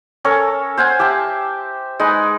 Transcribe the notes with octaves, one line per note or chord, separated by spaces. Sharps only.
C#4 A4 A#4 C#5
C5 F5 F#5 G#5
G4 E5 G5 A5
G#3 D#4 B4